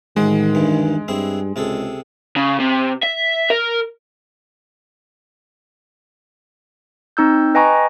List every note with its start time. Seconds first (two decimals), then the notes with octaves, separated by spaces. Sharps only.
0.16 A1 D#3 G#3 F#4 C5
0.55 D2 G2 E3
1.08 G2 C4 E4 G#4
1.56 C#2 C3 G#4 A4
2.36 C#3
2.59 C3
3.03 E5
3.50 A#4
7.17 C4 D#4 E6 G6
7.55 B4 D#5 G5 G#5 A#5 C#6